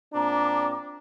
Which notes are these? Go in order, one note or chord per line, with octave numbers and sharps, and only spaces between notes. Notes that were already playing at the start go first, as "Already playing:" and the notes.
A#2 C4 D4 A#5 D6